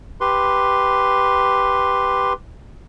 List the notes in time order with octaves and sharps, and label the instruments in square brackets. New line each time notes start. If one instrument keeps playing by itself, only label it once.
[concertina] G4 B4 C6